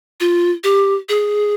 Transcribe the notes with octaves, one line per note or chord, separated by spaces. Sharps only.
F4
G4
G#4